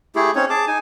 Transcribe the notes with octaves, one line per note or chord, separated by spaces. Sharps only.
A3 E4 G4 G#4
C4 C#4 D#4 C#5
G#4 A5 D6
D#4 G#5